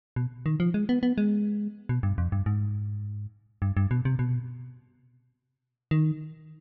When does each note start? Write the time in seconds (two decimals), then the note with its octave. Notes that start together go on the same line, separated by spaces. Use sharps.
0.16 B2
0.46 D#3
0.60 F3
0.74 G#3
0.89 B3
1.03 B3
1.18 G#3
1.89 B2
2.03 G2
2.18 F2
2.32 G2
2.46 G#2
3.62 G2
3.77 G2
3.91 B2
4.05 C3
4.19 B2
5.91 D#3